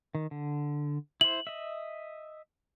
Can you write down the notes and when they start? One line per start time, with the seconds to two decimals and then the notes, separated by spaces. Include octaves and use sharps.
0.15 D#3
0.31 D3
1.21 E4 C5 F#7
1.47 D#5 E5